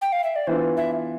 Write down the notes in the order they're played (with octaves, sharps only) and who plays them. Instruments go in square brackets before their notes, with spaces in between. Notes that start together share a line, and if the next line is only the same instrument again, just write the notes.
[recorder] G5
F5
E5
D5
[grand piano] E3 B3 D4 F4 [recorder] C5
[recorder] E5